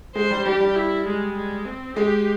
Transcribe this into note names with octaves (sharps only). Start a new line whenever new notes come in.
G#3 C5
G3
G3 G4
G3
E4
G#3
G#3
C4
G#3 G4